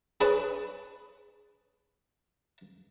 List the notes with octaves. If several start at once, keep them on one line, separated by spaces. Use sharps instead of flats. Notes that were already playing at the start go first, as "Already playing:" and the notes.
G#4 B4 C#5 A5